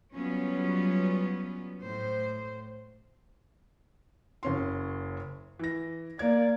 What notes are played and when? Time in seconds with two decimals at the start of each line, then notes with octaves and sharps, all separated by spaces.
0.14 F#3 G3 B3 C#4 F4
1.84 A2 C5
4.43 F#1 C#4 C6
5.59 E3 A#6
6.19 A#3 D5 G#6